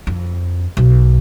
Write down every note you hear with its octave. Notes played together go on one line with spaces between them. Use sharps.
F2
B1